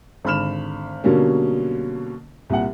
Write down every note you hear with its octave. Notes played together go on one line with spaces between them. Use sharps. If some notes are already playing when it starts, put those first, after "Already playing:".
G#1 D3 B5 F6 E7
B2 D3 F#3 G3 A#3 C#4
C2 A#2 F#5